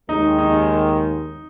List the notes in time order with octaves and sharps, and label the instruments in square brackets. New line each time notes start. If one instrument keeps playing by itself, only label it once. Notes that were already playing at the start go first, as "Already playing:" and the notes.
[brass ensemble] D#2 D#3 G#3 [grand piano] D#4
[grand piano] D#4